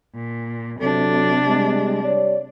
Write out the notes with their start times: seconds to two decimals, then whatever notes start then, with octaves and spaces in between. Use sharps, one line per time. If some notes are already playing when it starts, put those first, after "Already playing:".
0.15 A#2
0.80 C3 F#3 D4 A4
1.46 G3 G#3
2.03 G3 C#5 D5